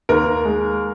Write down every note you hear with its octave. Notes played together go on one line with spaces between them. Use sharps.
D#2 A#4
G#3